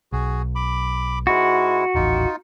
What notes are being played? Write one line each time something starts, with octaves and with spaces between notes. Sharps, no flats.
B1 F#4 G#4
B5 D6
G#2 G#3 E4 F#4
D#1 A1 D#4 F4